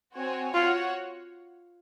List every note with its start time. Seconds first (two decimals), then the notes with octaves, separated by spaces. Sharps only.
0.14 C4 F#4 C#5 G#5
0.54 F4 F#4 C#5 F#5